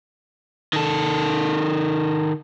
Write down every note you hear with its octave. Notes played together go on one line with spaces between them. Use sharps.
D#3 A4